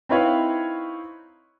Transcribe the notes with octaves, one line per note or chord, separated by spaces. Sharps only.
C4 D#4 E4 B4 C#5 F5